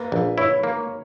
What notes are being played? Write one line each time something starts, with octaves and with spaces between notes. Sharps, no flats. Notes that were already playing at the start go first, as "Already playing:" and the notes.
Already playing: A#3 B4
A#1
E4 C#5
A#3